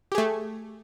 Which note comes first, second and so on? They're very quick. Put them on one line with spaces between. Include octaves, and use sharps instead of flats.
G4 G#4 A3